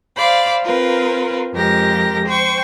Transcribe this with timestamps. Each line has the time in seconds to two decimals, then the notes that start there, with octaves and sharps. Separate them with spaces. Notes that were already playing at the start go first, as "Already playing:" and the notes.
0.16 C5 D5 F5 B5
0.62 C4 F4 A#4 B4
1.52 F2 F3 G#3 G4 A#4 A#6
2.26 C5 G5 C#6